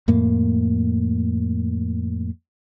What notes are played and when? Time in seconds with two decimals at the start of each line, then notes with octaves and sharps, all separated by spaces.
0.08 F2 A2 A#3